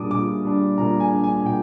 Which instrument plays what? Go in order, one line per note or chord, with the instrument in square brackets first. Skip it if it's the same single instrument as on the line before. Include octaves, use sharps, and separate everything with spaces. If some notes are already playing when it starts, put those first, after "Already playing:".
Already playing: [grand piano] A#2 G3 D4 D6 D#6
A#2 D6
G3 D4
A#2 A#5
G#5
G3 D4
G#5
G#5
A#2 G5